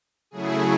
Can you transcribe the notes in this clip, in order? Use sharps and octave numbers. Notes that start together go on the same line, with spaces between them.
C#3 F#3 A3 E4 G#4